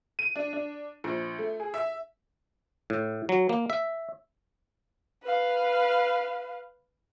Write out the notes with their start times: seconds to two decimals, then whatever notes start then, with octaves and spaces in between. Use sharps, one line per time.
0.19 D#7
0.36 D4
0.53 D4
1.04 A#1
1.38 A3
1.60 G#4
1.74 E5
2.90 A2
3.29 F#3
3.49 A#3
3.70 E5
5.23 B4 F5